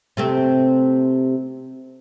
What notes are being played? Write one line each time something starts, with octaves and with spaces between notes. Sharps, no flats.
C3 A3 C4